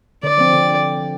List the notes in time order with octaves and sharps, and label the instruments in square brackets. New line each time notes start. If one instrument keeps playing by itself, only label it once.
[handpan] D3 [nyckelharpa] D5
[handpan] F3 C4
D3